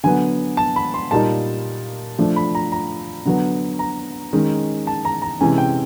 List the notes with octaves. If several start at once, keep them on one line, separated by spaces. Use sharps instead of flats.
D3 F#3 B3 G#5
A5
B5
C6
A#2 G3 A#3 D#4 A5
F3 A3 D4
B5
A#5
A#5
D3 F#3 B3
A#5
D#3 G#3 C#4
A5
A#5
A#5
C3 E3 G#3 C#4 G#5
G5